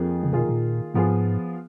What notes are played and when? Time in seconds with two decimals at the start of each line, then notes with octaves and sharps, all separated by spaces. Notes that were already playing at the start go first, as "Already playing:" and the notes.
Already playing: F2 F3 A#3 F4 G#4
0.23 C#3
0.33 B2 D#3 A#3 F4 G#4
0.49 A#2
0.94 G#2 F3 B3 F4 G#4